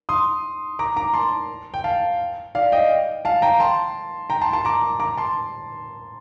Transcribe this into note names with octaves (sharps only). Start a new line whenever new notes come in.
C6 D#6
A#5 D6
A#5 D6
A5 C6
G5
F5 A5
D5 F5
D#5 G5
F5 A5
G5 A#5
A5 C6
G5 A#5
A5 C6
A5 C6
A#5 D6
A#5 D6
A5 C6